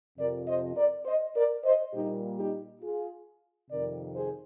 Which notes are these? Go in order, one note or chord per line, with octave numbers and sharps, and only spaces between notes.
F2 C3 F3 A#4 D5
C5 D#5
A#4 D5
C5 D#5
A#4 D5
C5 D#5
A#2 G3 A#3 D#4 G4
D#4 G4
F4 G#4
F2 C3 D#3 A#4 D5
G#4 C5